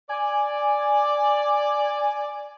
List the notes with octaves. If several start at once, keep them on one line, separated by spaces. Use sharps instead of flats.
D5 G#5